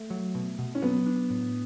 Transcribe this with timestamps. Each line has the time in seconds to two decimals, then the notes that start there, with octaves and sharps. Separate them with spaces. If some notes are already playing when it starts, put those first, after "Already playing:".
Already playing: A3
0.10 F#3
0.35 B2
0.59 B2
0.75 C#4
0.82 F#3 B3
1.06 D4
1.30 A2